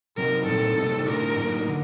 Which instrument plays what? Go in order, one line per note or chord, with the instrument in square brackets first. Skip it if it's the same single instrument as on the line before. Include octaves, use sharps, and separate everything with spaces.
[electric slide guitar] C3 F#3 C4 D#4 [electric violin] A#4
[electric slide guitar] A#2 G3 C4 D#4 [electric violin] A4
[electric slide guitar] C3 G3 A#3 D#4
[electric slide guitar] A2 A3 D4 [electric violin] A#4
[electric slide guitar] A2 F#3 A#3 D#4
D3